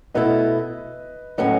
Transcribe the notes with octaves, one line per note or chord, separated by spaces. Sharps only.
B2 A3 E4 B4 D#5
A2 F#3 C#4 B4 D#5